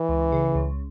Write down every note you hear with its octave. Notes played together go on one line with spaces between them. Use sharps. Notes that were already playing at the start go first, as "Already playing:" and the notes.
Already playing: E3
C#2
C#3
C#2